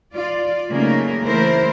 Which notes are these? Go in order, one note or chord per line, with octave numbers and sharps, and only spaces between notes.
F4 D5
C#3 F#3 A3 A#3 D#4 A#4
E3 A3 E4 A#4 C5